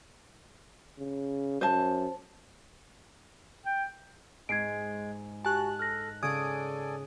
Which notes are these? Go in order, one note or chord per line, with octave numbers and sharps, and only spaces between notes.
C#3
F#2 C5 A5
G5
G#2 G#3 G#6 C7 D7
F#4 G4 G#5 A5 F#6
A4 F6 A#6
C#3 A4 D5 G#5 D#6 G#6 D7